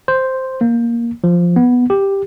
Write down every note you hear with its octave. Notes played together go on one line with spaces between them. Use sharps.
C5
A#3
F3
B3
G4